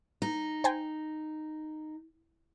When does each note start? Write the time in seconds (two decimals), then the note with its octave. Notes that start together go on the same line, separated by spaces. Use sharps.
0.22 D#4
0.64 C5 G5 G#5